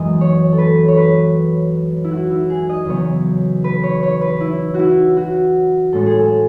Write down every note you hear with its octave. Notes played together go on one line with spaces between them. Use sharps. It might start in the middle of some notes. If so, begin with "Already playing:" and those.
Already playing: F#2 E3 G#3 B3 D#5
C#5
A4
B4
C#5
B4
E4
F#4
E4
G#4
D#5
E2 C#3 F#3 B3 C#5
B4
C#5
C#5
B4
E4
E4 F#4
F#4
A2 G#3 C#4 A4
G#4
A4